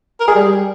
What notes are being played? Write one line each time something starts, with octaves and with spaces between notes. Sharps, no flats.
A#4
G#4
G3